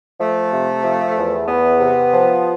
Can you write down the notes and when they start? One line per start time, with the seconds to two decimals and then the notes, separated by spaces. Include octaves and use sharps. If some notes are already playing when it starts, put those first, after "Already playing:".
0.20 F3 A3
0.52 C3
0.84 F3
1.17 E2
1.48 E2 B3
1.80 C3
2.12 F3